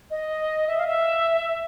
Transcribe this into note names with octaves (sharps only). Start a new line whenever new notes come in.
D#5
E5
F5
E5